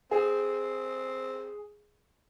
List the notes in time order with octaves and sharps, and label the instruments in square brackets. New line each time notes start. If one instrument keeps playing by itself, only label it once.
[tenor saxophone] C4 [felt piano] G#4